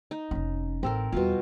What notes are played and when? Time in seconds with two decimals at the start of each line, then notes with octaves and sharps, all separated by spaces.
0.11 D#4
0.31 F1 C#4
0.83 A1 C4 A4 A#4
1.12 E2 B2 G3 F4